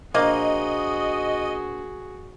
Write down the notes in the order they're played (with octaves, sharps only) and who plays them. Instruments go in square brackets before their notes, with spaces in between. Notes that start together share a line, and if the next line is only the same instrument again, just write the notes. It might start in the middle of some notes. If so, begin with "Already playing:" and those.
[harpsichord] A#1 [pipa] A#3 [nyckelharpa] F#4 G#4 [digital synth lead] D#5